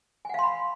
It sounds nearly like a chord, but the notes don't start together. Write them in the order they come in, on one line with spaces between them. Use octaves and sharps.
G#5 F#5 F5 C6 B5